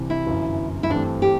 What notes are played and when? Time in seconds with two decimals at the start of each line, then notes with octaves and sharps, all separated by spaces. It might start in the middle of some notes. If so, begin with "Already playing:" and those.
Already playing: C2 C3 E3
0.10 E4
0.26 G1 F#2 E3
0.83 E4
0.90 G2 E3 A3 C4 D4
1.22 G4